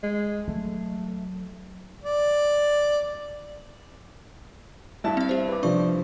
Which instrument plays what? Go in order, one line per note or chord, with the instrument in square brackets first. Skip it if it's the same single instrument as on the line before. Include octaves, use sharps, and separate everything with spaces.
[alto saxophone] G#3
[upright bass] F#3 [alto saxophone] A3
[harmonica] D5
[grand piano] G2 E4 A5
[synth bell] C4 E5
G4 C5
[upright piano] B4 D6
[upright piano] C3 F3 [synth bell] D4 D5 C#6